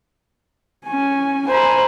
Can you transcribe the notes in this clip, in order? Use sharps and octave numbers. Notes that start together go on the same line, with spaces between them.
C#4 G#5
C5 G#5 A#5 B5